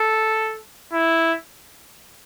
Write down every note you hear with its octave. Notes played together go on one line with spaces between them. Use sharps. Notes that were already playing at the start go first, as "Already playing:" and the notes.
Already playing: A4
E4